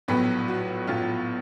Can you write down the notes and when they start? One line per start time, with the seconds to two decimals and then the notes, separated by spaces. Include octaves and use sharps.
0.08 A#1 A2 F#3 B3 B4
0.48 F#4
0.87 A#1 A2 F#3 F4